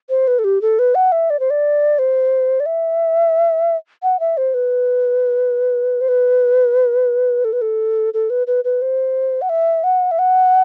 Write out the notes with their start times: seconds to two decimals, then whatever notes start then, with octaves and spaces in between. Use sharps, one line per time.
0.09 C5
0.27 B4
0.39 A4
0.44 G4
0.62 A4
0.79 B4
0.95 F#5
1.12 E5
1.30 D5
1.40 C5
1.50 D5
1.99 C5
2.60 D5
2.66 E5
4.03 F#5
4.20 E5
4.37 C5
4.54 B4
6.01 C5
6.08 B4
7.44 A4
7.53 B4
7.61 A4
8.14 A4
8.30 B4
8.47 B4
8.64 B4
8.82 C5
9.42 F#5
9.49 E5
9.84 F#5
10.11 E5
10.19 F#5